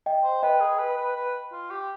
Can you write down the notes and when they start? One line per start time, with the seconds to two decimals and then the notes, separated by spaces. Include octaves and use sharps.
0.06 D#5 G5
0.24 C5
0.43 B4 D#5 G5
0.61 G#4
0.79 B4
0.97 B4
1.16 B4
1.52 F4
1.71 G4